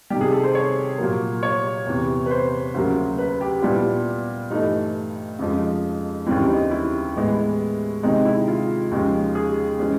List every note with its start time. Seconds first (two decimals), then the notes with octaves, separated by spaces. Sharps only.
0.10 C3 D#3 G3 G4
0.21 G#4
0.32 A4
0.43 C5
0.55 C#5
0.98 A#2 F#3 A#3
1.43 C#5
1.86 E2 C3 E3
2.26 B4
2.31 C5
2.74 D2 C#3 F#3 A#3
3.18 B4
3.41 G4
3.62 A#2 G3 B3 D4 E4
4.51 G2 E3 A3 D#4
5.39 F2 C#3 F3 G#3
6.26 D#2 C#3 E3 G3 C4 E4
6.49 D#4
6.71 E4
7.16 A2 E3 G#3 B3
8.03 C3 D#3 G#3 C4 D#4
8.25 E4
8.47 F4
8.91 D#2 C#3 F3 G#3
9.35 G#4
9.79 E3 G#3 C#4